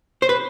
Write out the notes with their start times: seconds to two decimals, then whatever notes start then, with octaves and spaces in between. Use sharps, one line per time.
0.22 C5
0.29 B4